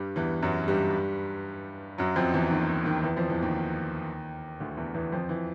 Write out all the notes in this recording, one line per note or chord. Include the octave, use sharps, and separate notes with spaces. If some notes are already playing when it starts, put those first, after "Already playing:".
Already playing: G2 G3
E2 E3
F#2 F#3
G2 G3
F#2 F#3
F2 F3
E2 E3
D#2 D#3
D#2 D#3
E2 E3
F2 F3
E2 E3
D#2 D#3
D2 D3
E2 E3
E2 E3
F2 F3
E3